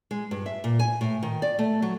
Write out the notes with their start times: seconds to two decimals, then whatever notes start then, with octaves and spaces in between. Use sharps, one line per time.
0.11 G#3
0.31 G2
0.46 E5
0.64 A#2
0.79 G#5
1.01 A2
1.23 D#3
1.42 D5
1.59 A3
1.82 F#3